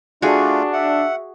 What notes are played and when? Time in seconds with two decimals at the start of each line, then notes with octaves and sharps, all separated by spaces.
0.22 A3 D4 F4 F#4 G#4
0.73 E5 F#5